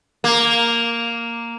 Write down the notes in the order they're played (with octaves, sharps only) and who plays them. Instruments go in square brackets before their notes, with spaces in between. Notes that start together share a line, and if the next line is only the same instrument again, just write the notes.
[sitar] A#3